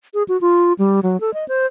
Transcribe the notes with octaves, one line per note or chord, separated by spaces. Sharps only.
G#4
F#4
F4
G3
F#3
A4
D#5
C5